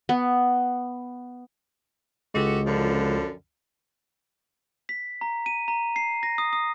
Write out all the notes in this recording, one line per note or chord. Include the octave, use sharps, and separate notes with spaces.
B3
C#2 G#3 F#4 G4 A4
F#2 D3 F3
B6
A#5
D#7
A#5
C7
A#6
D#6
D#6